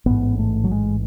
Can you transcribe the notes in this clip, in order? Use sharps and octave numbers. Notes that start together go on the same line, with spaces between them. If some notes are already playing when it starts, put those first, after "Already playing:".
A1 G#2 B3
A3
F#3
G#3